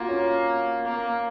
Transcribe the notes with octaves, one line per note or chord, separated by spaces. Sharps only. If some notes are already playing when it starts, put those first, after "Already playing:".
Already playing: A#3 F4 F#4
C#4
A#3